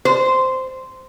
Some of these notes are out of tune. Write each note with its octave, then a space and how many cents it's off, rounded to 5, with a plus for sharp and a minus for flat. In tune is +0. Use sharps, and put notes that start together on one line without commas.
C5 -10